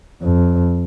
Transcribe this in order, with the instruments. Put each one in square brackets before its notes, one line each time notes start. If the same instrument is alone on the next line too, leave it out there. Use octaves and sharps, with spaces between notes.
[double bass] F2